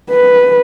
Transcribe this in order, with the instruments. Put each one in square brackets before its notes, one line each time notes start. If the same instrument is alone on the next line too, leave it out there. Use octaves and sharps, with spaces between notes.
[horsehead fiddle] B4